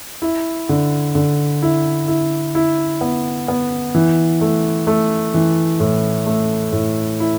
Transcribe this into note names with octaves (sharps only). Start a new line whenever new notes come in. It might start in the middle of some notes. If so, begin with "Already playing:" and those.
E4
D3
D3
E4
E4
E4
B3
B3
E3
A3
A3
E3
A2
A3
A2
E4